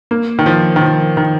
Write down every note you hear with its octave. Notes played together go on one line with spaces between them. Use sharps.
A#3
D#3
F3
D#3
F3
D#3